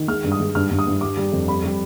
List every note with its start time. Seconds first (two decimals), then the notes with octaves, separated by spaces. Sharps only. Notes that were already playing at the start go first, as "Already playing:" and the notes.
Already playing: D#3
0.08 G#3 F6
0.24 G2
0.32 D#6
0.40 G#3
0.55 G2 F6
0.71 G2
0.79 D#6
0.87 G2
1.01 G3 D6
1.17 G3
1.32 F2
1.48 G3 B5
1.64 G3